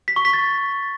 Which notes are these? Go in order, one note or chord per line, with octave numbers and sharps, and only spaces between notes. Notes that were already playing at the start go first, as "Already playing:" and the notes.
B6
C#6
B6
A6